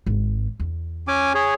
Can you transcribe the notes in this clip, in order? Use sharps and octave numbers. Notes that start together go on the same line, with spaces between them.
G#1 G#2
E2
C#4 G#5 D6
G#4 C#5